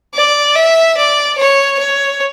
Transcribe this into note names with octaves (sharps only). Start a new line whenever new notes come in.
D5
E5
D5
C#5
C#5